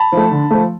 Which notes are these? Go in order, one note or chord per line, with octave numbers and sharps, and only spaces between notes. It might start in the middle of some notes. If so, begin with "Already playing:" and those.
Already playing: A5 B5
F3 A3
D3
F3 A3